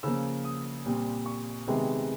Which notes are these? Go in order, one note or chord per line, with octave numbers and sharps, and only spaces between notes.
C#3 F3 A#3 E6
D#6
A#2 G3 C4
C#6
C3 D#3 G#3 B3